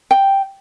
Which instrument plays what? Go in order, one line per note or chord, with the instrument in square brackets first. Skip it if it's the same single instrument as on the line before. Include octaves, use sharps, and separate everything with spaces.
[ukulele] G5